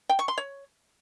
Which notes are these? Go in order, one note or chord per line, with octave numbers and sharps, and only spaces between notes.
G5
C#6
C6
C#5